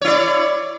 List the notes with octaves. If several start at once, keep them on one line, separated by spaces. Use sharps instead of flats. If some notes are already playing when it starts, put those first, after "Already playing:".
E4 C#5 D5